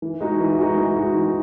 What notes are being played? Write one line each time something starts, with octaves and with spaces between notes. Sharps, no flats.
E3
G#3 D#4 F#4
E3
G#3 D#4 F#4
E3
G#3 D#4 F#4
E3